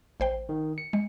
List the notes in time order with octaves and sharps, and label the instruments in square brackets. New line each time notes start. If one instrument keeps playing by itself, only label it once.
[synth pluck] A1 C5 G5
[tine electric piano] D#3
C#7
[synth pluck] G#3